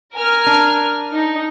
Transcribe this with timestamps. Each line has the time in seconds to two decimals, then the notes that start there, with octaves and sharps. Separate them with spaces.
0.15 A#4 G#5 F6
0.46 D4
1.13 D#4